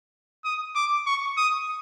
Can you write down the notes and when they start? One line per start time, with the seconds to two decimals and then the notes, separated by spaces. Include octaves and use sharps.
0.45 D#6
0.76 D6
1.07 C#6
1.38 D#6